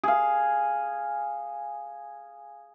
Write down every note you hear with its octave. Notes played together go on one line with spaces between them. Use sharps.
G#4 F5